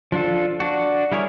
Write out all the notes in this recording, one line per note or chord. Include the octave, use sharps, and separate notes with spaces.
F3 D4 F4 A4
D4 F#4
G3 E4 G#4 A#4 C#5